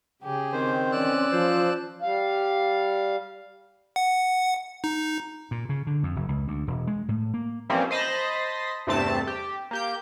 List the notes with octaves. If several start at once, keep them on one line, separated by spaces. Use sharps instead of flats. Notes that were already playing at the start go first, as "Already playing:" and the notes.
C#3 G4 G#4
D#3 C4 C5
E3 C#4 D5 E6 F#6
F3 C5
G3 F5
F#5
D#4
A#2
C#3
D3
F2
F#1
C#2
D2
E1
G#3
A2
A#3
E3 F3 G3 A#3 C4 C#4
C5 D#5 A5 B5 C6 A#6
E2 G2 C3 A3 C4 A5
G4
A#3 G4 G6